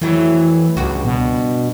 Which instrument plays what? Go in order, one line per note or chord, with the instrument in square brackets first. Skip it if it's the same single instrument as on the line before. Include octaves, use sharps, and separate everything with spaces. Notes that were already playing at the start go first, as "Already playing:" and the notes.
[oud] F2 F#3 A3 [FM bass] E3
[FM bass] C#2 [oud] G2 F#4
[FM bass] B2